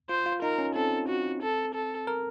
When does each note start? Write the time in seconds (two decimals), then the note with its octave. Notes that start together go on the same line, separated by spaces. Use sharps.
0.09 F4 C5
0.26 F4
0.42 D#4 A#4
0.58 C#4
0.75 C4 A4
1.08 F#4
1.42 A4
1.74 A4
2.07 A#4